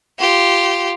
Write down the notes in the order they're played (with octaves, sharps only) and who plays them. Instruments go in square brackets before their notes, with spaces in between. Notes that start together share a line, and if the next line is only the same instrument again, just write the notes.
[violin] F4 G4